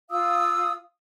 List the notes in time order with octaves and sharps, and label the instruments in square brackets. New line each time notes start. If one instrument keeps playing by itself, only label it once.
[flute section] F4 F5 D#6 E6